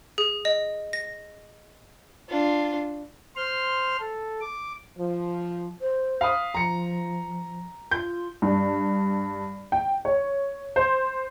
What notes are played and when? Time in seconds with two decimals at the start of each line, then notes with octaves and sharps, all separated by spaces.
0.18 G#4
0.45 D#5
0.93 A#6
2.29 D4 F4
3.36 C5 C6 F6
3.99 A4
4.41 D6
4.98 F3
5.81 C5
6.21 F5 B5 D#6
6.54 F3 A#5 C#7
7.91 F4 G6
8.42 G2
9.72 G5
10.05 C#5
10.76 C5